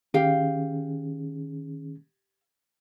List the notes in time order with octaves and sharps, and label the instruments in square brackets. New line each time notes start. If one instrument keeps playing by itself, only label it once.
[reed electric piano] D#3 C#4 G#4 [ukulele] G4 F5